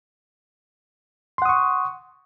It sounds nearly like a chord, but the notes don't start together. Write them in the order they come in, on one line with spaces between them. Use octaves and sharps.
C6 F#5 D#6 C#6